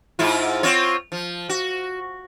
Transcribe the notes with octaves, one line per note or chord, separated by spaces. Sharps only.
G#2 E4 F4
C4 F4 C#5
F3
F#4